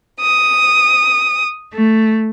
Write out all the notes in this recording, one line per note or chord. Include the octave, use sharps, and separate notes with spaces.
D#6
A3